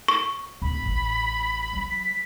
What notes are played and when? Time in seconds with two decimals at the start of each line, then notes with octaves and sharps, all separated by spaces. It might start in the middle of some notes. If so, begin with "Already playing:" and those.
0.08 C#6
0.62 D1 B5
0.85 A1
1.73 F#3
1.90 B6